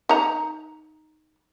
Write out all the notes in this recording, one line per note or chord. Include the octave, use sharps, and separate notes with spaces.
D#4 A#5